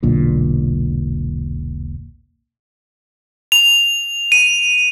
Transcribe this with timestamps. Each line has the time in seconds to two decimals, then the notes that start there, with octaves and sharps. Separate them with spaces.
0.03 E1 B1 A#2 D3
3.52 F7
4.32 D#7